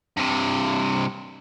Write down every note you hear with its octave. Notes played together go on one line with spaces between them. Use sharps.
G2 C3